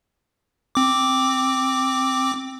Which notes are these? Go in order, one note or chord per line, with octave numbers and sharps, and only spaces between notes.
C4 D6